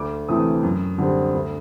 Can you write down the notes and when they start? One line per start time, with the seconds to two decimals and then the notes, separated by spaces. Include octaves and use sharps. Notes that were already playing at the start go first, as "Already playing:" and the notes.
Already playing: D2 D6
0.29 C3 E3 A3 D#6
0.63 F#2
0.98 D3 G3 C4
1.34 D2